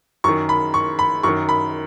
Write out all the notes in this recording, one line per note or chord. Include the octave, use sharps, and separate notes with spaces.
F#2 D#3 C#6
B5
C#6
B5
F#2 D#3 C#6
B5